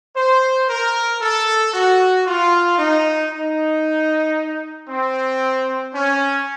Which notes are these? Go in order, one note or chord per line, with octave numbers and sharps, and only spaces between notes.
C5
A#4
A4
F#4
F4
D#4
D#4
C4
C#4